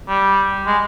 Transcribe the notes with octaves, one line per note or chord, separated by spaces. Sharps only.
G3
G#3